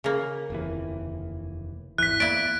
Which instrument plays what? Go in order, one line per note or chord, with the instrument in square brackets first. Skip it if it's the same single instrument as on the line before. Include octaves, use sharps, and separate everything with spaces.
[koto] C#3 A#3
[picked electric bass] F1 D#2 E3
[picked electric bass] G#1 E2 E3 [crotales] F#6 B6
[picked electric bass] E2 A#3 [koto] E4 D5 [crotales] D7